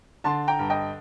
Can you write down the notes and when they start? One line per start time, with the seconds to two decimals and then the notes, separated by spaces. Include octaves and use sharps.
0.24 D3 A5 C6
0.47 G5 A#5
0.59 G2
0.70 D#5 G5